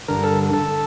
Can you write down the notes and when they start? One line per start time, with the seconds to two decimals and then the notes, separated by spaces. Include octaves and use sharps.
0.08 G2 D3 A#4
0.24 A4
0.53 A4